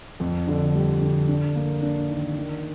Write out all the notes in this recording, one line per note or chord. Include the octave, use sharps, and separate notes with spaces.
F2
D3
G3
D3
D4
A#3
D4
D#3
D#3